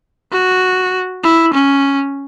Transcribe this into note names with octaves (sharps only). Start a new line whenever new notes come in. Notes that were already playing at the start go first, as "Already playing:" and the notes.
F#4
E4
C#4